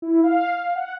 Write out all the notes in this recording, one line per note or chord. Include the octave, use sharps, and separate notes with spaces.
E4
F5
F#5